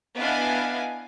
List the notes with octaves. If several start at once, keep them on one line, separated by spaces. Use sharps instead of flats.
B3 D4 E4 D#5 F5 G#5